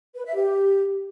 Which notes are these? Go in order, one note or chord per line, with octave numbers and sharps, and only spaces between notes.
B4
E5
G4